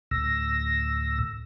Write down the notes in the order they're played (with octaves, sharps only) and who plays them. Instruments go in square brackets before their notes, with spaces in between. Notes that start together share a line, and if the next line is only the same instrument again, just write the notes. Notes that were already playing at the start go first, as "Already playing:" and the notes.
[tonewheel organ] D2 A2 E6 A#6